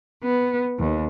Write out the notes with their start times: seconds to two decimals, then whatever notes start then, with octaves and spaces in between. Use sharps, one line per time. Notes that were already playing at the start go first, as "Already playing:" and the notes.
0.22 B3
0.78 D#2